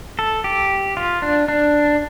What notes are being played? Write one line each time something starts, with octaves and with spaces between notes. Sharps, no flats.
A4
G4
F4
D4
D4